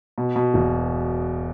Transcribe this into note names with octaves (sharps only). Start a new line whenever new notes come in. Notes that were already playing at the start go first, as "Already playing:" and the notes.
B2
B2
E1